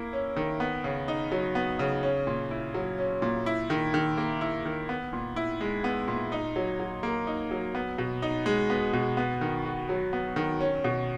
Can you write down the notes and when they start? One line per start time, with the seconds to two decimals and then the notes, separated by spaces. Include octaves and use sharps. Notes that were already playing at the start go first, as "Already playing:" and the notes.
Already playing: A#3 E4
0.13 C#4
0.36 D#3
0.60 B3
0.84 C#3
1.08 D#4
1.32 F#3
1.55 B3
1.79 C#3
2.03 C#4
2.27 A#2
2.51 E4
2.74 F#3
2.98 C#4
3.22 A#2
3.46 E4
3.70 D#3
3.94 D#3
4.18 A#3
4.41 E4
4.65 D#3
4.89 B3
5.13 A#2
5.36 E4
5.61 G#3
5.84 B3
6.08 A#2
6.32 D#4
6.56 F#3
6.80 F#3
7.03 A#3
7.27 D#4
7.51 F#3
7.75 B3
7.98 B2
8.22 D#4
8.46 G#3
8.70 B3
8.93 B2
9.17 B3
9.41 D#3
9.65 F#4
9.89 F#3
10.13 B3
10.36 D#3
10.60 C#4
10.84 B2